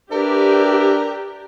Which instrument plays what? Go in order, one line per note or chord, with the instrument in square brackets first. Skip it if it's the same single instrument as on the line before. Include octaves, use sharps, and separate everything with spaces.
[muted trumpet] D4 [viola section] G4 [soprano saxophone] A#4 [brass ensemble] B4 D5 E5